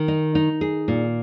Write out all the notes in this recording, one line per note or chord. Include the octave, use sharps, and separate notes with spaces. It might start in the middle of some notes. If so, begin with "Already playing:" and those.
Already playing: D#3
D#4
D#4
G#4
A#2